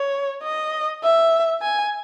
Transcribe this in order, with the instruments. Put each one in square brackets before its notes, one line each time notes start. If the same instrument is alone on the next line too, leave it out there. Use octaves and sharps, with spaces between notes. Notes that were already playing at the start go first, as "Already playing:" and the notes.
Already playing: [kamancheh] C#5
D#5
E5
G#5